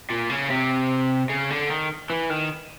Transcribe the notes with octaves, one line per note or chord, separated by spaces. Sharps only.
A#2
C#3
C3
C#3
D3
D#3
E3
D#3